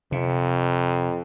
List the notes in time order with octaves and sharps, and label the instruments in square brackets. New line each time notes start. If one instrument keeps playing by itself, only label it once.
[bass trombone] F2 [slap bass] C3